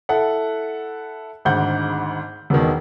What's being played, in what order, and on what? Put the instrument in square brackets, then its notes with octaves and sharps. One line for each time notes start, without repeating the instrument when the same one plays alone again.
[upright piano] E4 A4 F#5
G#1 D2 G#2 F#5 G6
E1 B2 D#3